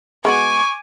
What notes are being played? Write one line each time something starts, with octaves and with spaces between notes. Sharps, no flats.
G#3 B3 F#4 G#5 C#6 D6